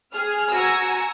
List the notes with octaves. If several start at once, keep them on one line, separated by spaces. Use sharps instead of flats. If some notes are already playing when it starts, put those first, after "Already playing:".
G#4 F6
F#4 G#5 A#5 E6 A#6 C#7